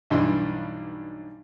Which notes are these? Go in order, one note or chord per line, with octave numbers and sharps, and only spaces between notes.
B1 G2 E3 G3 D4 C6